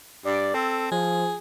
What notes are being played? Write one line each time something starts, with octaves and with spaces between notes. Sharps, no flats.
G2 D5
C4 A4
F3 G#4